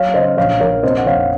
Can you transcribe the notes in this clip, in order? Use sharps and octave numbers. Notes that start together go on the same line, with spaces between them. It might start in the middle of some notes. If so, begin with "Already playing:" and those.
Already playing: F#3 C#5 F5
C#3 C5 D#5
A#1 C#5 F5
A#1 A#4 C#5
C3 C5 D#5
F#5
F1 C#5 F5